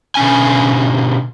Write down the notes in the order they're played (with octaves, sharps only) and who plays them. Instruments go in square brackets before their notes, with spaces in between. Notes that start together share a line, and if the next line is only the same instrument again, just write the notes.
[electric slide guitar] B2 D3 C#4 G#5